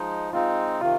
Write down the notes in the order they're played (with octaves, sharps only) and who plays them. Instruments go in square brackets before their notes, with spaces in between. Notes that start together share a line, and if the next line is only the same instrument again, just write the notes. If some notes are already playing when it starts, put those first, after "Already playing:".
Already playing: [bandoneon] F3 G#3 D#4
[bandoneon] G#3 C4 D#4 [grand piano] F4
[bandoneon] C3 D#3 [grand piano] F4